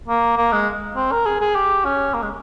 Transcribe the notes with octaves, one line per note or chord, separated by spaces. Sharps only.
A#3
A#3
G#3
C4
A#4
G#4
G#4
G4
C#4
A#3
G#3